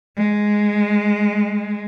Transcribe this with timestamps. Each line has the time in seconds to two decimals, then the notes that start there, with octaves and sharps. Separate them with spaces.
0.17 G#3